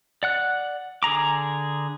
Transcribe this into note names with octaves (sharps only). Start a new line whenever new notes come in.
D5 F#5 F#6
D3 G#4 A#5 D6